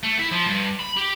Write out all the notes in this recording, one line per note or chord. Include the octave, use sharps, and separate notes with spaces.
A3
E4
F3
G2
B5
G4